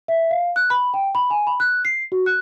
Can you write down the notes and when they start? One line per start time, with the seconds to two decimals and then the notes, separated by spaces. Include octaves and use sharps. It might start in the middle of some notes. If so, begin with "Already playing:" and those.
0.08 E5
0.31 F5
0.56 F#6
0.70 B5
0.94 G5
1.15 B5
1.30 G#5
1.47 B5
1.60 F#6
1.85 C7
2.12 F#4
2.26 F#6